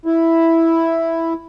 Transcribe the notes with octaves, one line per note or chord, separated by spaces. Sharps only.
E4